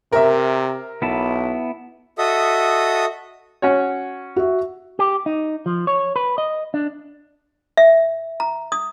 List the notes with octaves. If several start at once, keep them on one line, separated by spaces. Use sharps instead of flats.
C3 A#4 E5
B1 B3 E4 A5
F#4 A4 D#5 E5 D#6
C#4 F#4 C#5
F#4 E5
G4
D#4
F3
C#5
B4
D#5
D4
E5
A#5
D#6